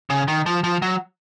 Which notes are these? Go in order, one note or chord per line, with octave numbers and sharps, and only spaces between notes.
C#3
D#3
F3
F3
F#3